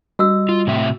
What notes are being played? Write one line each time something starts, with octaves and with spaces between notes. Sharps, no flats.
G3 F#4 D#5 E6
F4
A2 C3 E5